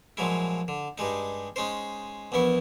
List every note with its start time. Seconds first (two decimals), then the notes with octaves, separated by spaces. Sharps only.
0.17 A#2 F3 F#3 G#3 E4
0.68 D3
0.98 G2 G3 G#3 D#4
1.56 G#3 C#4 D#4 C5
2.32 A#1 E2 B3 E4 C#6